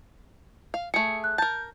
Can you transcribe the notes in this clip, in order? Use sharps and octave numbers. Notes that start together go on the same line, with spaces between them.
F5
A3 G#4 C#7
F#6
A#4 A5 G6